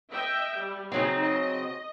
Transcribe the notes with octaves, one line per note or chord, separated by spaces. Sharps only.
D#5 E5 G5
G3
C#3 F#3 C4 D#4
D#5